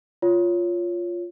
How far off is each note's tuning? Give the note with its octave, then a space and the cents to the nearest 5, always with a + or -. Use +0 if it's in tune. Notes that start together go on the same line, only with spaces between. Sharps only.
F4 +0 C#5 +10